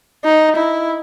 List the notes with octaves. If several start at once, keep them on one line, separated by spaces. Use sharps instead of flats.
D#4
E4